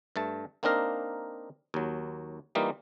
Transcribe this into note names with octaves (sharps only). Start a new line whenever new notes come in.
G2 A3 A5
A#3 C4 D4 D#4 A#4 F5
D#2 F#3
E3 G3 A#3 D#4 F4